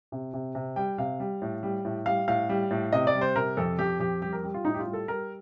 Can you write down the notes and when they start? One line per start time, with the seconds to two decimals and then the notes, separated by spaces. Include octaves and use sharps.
0.12 C3
0.34 C3
0.55 C3
0.76 G3 G5
0.98 C3 F5
1.20 G3
1.42 A2
1.63 G3
1.85 A2
2.06 G3 F5
2.28 A2 F5
2.49 G3
2.71 A2
2.92 C3 D#5
3.07 D5
3.14 G3
3.21 C5
3.35 C3 A#4
3.57 F2 A4
3.79 F2 G4
4.00 F2 G4
4.22 G3 G4
4.33 A#4
4.43 G3
4.54 F4
4.65 A2 D#4
4.74 G4
4.79 F4
4.87 G3
4.93 A4
5.08 G3 A#4